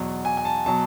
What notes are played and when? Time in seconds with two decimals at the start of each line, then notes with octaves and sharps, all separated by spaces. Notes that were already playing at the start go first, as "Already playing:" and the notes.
Already playing: E2 B2 F#3
0.25 G#5
0.37 G#5
0.45 A5
0.66 B2 F#3 A5